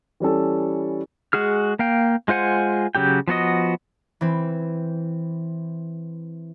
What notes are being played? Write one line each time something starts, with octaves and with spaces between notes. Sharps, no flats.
E3 G3 C#4 A4
G#3 F#4 G#4 F6
A#3 F5 G5
G#3 F4 C5 F#5 G#5
C#3 F#3 G4 G5
F3 B3 F#4 D#5
E3 C4